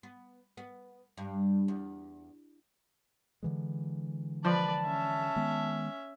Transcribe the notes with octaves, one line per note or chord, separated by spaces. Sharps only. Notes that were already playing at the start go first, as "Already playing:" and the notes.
B3
B3
G2
E2
D3 E3 G#3
F3 B4 D5 A5
C#4 E5
D#3 G#3 B3